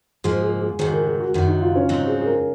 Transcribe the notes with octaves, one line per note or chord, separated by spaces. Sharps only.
G#2 F3 A#3 G#4
G#4
G#4
G#2 D#3 F#3 G#4
A#4
G#4
F#4
F#2 D#3 F#3 F#4
D#4
F4
C#4
G#2 F#3 C4 D#4
G#4
G#4
A#4